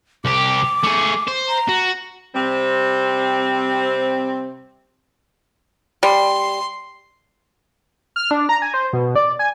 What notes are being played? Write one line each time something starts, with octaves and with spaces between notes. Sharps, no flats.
C2 G4 D6
A3 G#4
C5
A#5
F#4
C3 G3 C4
G3 C6
F6
D4
A#5
G#5
C5
B2
D5
G#5